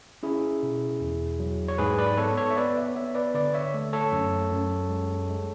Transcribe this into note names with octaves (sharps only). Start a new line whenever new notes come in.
C#4 E4 G#4
B2
E2
F#3
C#5
G#2 G#4 B4
B4 D5
B3 A4 C#5
A4 C#5
E5
B3 B4 D5
C#5 E5
B3 C#5 E5
B4 D5
D3 B4 D5
C#5 E5
A3
A4 C#5
F#2
F#2
G#3
G#3